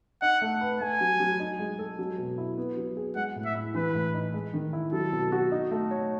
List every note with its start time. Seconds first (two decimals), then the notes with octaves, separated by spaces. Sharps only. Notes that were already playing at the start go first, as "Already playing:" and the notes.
0.22 D#4 F#5
0.42 A3
0.61 B4
0.80 A3 G#5
1.01 F#3
1.20 F#3
1.40 D#4
1.59 G#3
1.79 A4
1.99 F#3
2.18 B2
2.38 E4
2.58 B3
2.77 F#3
2.97 G#4
3.16 G#3 F#5
3.36 A2
3.45 E5
3.55 E4
3.75 E3 B4
3.95 A2
4.14 D#4
4.34 G#3
4.54 D#3
4.73 E4
4.92 F#3 A4
5.12 B2
5.32 F#4
5.52 D#4
5.71 A3
5.91 C#5